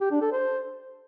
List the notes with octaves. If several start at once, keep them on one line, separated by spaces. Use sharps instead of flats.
G4
D4
A4
C5